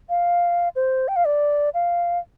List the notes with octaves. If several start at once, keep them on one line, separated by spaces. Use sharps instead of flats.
F5
C5
G5
F5
D5
F5